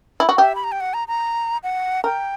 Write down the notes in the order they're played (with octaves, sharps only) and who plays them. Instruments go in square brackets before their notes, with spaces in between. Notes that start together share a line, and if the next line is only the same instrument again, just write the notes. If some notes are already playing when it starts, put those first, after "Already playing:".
[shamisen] E4
F#4
[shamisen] G4 [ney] E5
[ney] B5
A#5
G5
F#5
A#5
A#5
F#5
[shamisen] A#4 [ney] G5